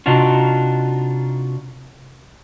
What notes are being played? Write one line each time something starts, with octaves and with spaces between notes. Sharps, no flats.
C3 D4 D#4 F4 F#4